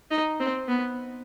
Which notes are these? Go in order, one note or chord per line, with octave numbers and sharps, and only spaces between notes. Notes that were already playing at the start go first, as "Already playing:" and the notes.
D#4
C4
B3